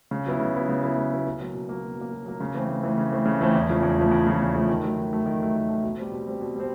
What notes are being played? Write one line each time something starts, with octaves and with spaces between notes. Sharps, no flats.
C#3
F#3 B3 E4
C#3
F#3 B3 E4
C#3
F#3 B3 E4
C#3
F#3 B3 E4
B2
F#3 A#3
B2
F#3 A#3
B2
F#3 A#3
B2
F#3 A#3
C#3
E3 A3 C4
C#3
E3 A3 C4
C#3
E3 A3 C4
C#3
E3 A3 C4
E2
C#3 F3 A3
E2
C#3 F3 A3
E2
C#3 F3 A3
E2
C#3 F3 A3
D#3
F#3 A3
D#3
F#3 A3
D#3
F#3 A3
D#3
F#3 A3
B2
G3 C4
B2
G3 C4
B2
G3 C4